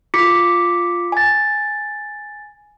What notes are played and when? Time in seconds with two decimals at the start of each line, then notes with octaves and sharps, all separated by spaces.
0.14 F4 D6 B6 C#7
1.12 G#5 A6